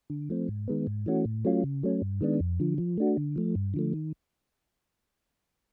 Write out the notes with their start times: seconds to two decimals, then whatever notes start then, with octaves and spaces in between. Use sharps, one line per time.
0.10 D3
0.30 F3 A3 C4
0.48 G#2
0.68 D#3 G#3 B3
0.87 G#2
1.06 E3 A3 C#4 F#4
1.25 A2
1.45 F#3 A3 C#4 F4
1.64 C#3
1.83 F#3 A3 C#4
2.02 G2
2.21 D#3 G#3 B3 D4
2.40 F2
2.60 D3 F3
2.78 F3
2.98 A3 D4 F#4
3.17 D3
3.36 F3 A3
3.55 G2
3.74 D3 F3 A3
3.93 D#3